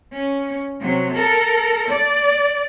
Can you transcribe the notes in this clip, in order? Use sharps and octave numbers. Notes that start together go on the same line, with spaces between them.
C#4
C3 F#3
A4 A#4
D5